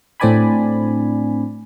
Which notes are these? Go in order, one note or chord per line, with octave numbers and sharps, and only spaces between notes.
A2 C4 D4 D5 G#5 B5